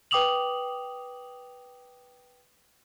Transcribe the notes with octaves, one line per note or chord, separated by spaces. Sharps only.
B4 G5 D6 D#6 F7 F#7